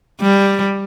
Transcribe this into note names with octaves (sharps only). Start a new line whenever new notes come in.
G3